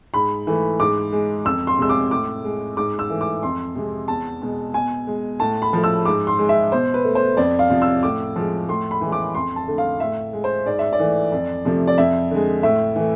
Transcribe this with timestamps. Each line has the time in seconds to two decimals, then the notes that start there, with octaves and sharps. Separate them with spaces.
0.14 G#2 B5
0.47 E3 A3
0.80 G#2 D6
1.12 G#3
1.45 F2 E6
1.67 C6
1.78 C3 G#3 E6
1.89 D6
2.11 A2 D6
2.44 G#3
2.77 G#2 D6
2.99 E6
3.10 E3 A3
3.21 D6
3.43 F2 C6
3.75 C3 G#3
4.08 E2 A5
4.42 B2 G#3
4.74 B2 G#5
5.07 G#3
5.40 A2 A5
5.62 B5
5.73 F3 A3
5.84 E6
6.05 G#2 D6
6.27 C6
6.39 G#3
6.49 E5
6.72 B2 C5
6.94 B4
7.04 A3
7.15 C5
7.37 F2 D5
7.59 F5
7.70 C3 F3
7.82 E6
8.03 A2 D6
8.36 F3 G#3
8.68 A2 C6
8.91 B5
9.01 E3 G#3
9.12 D6
9.35 F2 C6
9.56 A5
9.68 D3 A3
9.78 F5
10.00 A2 E5
10.33 G#3
10.44 C5
10.66 G#2 D5
10.79 E5
10.93 D5
11.00 E3 A3
11.32 F2
11.65 C3 F3 A3
11.87 D5
11.98 F2 E5
12.31 D3 G#3
12.63 A2 E5
12.96 E3 A3